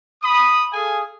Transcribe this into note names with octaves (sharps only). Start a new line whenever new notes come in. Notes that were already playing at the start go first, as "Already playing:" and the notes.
B5 D#6
G#4 A4 F5 G#5 D#6